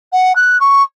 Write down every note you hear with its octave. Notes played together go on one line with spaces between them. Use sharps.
F#5
F#6
C#6